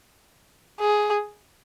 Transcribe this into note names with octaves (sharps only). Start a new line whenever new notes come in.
G#4